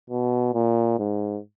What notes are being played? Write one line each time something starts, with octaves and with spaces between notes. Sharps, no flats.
B2
A#2
G#2